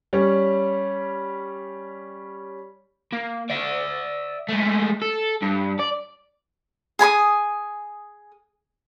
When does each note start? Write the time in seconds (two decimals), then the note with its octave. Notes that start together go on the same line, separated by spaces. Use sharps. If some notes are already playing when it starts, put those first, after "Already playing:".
0.13 G3 C#4
3.12 A#3
3.50 D5 E5
4.49 G#3 A3
5.02 A4
5.42 G2
5.80 D5
6.99 G#4 G#5 B5 D#6